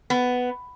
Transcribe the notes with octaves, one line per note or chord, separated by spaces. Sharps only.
B3